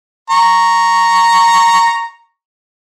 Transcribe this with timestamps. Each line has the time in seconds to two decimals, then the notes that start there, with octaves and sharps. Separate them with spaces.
0.30 A#5 C#6